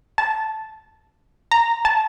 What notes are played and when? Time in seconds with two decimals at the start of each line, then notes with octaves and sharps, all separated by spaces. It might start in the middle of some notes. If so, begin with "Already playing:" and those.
0.18 A5
1.51 A#5
1.85 A5